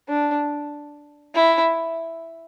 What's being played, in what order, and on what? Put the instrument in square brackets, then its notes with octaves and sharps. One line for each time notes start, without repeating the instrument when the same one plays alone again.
[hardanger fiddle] D4
E4